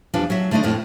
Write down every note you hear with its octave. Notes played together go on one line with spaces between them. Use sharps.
E2 F3 G3 D4
F#3 E5
D3 A3 D4 D#4 D#5
F2 A2 A3